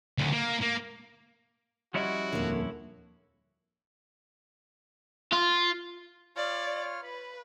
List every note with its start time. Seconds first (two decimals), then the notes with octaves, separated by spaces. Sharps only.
0.18 D2 A2
0.33 A#3
0.62 A#3
1.94 F3 G3 C#4 E4 F#4 C#5 D#5
2.33 D#1 F2 D3 A#3
5.33 F4
6.37 F4 C#5 D5 F6
7.03 B4 B5